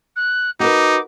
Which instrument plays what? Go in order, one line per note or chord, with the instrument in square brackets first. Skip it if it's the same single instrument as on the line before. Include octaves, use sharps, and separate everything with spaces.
[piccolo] F#6
[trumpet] D#4 [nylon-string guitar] F#4 A#4 B4 [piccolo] D6